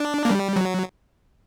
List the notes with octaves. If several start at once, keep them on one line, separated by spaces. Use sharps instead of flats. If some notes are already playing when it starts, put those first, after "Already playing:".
Already playing: D4
A#3
G3
F#3